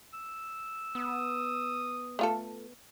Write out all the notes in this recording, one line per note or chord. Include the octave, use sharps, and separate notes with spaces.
E6
B3 D#6
A3 F4 A4